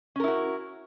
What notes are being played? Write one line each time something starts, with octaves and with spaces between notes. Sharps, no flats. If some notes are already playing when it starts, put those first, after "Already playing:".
C#4 E4 F#4 A#4